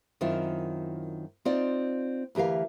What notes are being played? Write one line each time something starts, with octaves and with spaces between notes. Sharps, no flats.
F#2 D#3 C4 E4 F4
C4 D#4 F4 D5
D2 E3 G4 A#4 F5